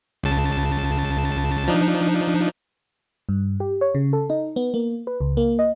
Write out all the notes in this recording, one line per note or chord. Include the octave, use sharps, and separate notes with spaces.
C#2 C#3 A5
F3 D4 D#4
G2
G4
C#5
C#3
A4
D#4
B3
A#3
B4
C#2
A#3
D#5